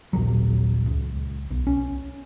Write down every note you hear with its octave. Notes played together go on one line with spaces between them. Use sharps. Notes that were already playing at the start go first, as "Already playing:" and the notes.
D#1 A#1 F#3
C#2
B1
C#4